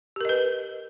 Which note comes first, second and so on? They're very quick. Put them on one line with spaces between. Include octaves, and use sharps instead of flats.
G4 A#4 D#5 B4